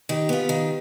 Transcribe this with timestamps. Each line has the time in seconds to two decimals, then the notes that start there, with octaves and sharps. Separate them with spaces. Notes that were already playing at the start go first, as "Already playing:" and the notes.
0.09 D#3 G4
0.29 B3 F4
0.49 D#3